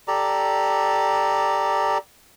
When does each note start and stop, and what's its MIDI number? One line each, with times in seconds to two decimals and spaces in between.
0.08 1.98 67
0.08 1.98 69
0.08 1.98 74
0.08 1.98 82